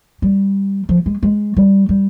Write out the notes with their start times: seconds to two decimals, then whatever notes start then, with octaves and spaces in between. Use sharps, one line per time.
0.22 G3
0.89 F3
1.06 G#3
1.23 G#3
1.56 G3
1.89 G3